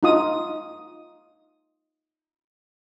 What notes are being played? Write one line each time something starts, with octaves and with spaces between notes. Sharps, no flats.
D#4 F4 D#6